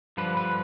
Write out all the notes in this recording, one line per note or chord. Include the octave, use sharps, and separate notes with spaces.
G2 D3 F3 B4
B4